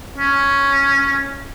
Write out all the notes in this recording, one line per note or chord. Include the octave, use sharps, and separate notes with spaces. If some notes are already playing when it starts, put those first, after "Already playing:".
C#4